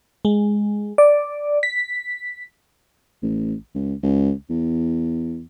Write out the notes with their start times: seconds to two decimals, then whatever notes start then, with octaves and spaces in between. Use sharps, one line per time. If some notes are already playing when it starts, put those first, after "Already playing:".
0.25 G#3
0.98 D5
1.63 B6
3.22 A1
3.75 C#2
4.03 C#2
4.50 E2